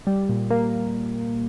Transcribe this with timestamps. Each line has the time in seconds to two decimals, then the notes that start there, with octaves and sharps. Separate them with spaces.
0.07 G3
0.29 A#2
0.50 A#3